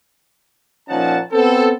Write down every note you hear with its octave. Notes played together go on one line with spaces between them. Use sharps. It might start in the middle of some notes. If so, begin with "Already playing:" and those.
A#2 F3 C#4 D#4 F#5 A5
B3 C4 A4